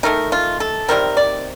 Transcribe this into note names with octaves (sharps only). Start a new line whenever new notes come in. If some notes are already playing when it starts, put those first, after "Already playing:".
D#3 A3 D#4 A#4
F4
A4
C3 D#3 G3 C4 A#4
D5